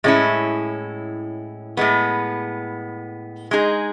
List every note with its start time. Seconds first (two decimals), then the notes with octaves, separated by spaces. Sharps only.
0.04 A2 G#3 C#4 E4
1.77 A2 G#3 B3
3.51 G#3 D#4 G#4